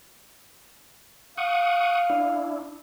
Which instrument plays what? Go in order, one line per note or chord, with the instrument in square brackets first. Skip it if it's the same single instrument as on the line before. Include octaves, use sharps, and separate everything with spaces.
[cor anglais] F5 [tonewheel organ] F#5 C#6 D#6
[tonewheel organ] D4 E4